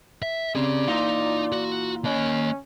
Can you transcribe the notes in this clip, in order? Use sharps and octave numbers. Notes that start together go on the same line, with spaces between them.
E5
C3 C#4 G#4 D5
A#2 E3 D#4 F4
F#4
A#3 C#4 D#5